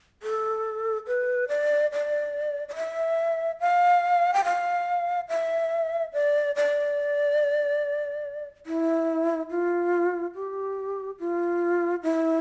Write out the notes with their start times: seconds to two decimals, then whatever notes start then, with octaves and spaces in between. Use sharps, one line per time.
0.23 A4
1.07 B4
1.49 D5
1.92 D5
2.69 D5
2.76 E5
3.60 F5
4.34 G5
4.45 F5
5.29 E5
6.13 D5
6.56 D5
8.66 E4
9.51 F4
10.35 G4
11.20 F4
12.03 E4